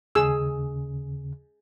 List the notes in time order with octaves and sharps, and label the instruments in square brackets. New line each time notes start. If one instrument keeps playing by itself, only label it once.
[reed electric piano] D#2 C#3 [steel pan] G#4 E6